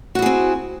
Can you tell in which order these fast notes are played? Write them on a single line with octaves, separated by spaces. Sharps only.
F#4 E4 G#4 C4